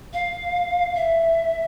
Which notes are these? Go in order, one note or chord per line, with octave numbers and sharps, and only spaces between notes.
F5
E5